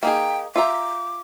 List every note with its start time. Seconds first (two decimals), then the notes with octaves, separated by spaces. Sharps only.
0.03 A#3 D#4 G#4 G5
0.56 F4 E5 A#5 D6